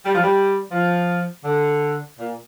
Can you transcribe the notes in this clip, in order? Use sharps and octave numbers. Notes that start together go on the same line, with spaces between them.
G3
F3
G3
F3
D3
A#2